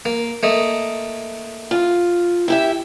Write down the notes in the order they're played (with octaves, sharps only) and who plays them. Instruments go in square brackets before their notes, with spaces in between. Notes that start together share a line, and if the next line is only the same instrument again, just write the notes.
[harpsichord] A#3
A3 A#3 D#5
[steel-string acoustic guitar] F4
E4 G4 E5